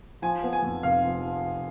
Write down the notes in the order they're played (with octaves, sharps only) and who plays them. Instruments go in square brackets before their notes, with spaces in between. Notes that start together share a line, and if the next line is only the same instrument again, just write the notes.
[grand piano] F3 [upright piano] G#5
[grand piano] B3
[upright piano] G#5
[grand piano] F2
[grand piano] F1 [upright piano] F5
[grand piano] F3